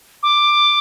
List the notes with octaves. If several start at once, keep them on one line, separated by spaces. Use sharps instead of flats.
D6